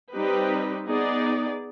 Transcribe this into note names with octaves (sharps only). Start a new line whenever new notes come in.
G3 C4 D#4 G4 B4
B3 D#4 G#4 D5